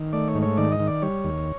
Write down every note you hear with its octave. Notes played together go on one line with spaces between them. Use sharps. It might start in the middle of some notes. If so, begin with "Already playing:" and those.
Already playing: D#3
A3 D5
C#5
G#2
C#5
D#3 D5
D#5
D#3
D5
G3 C#5
D#2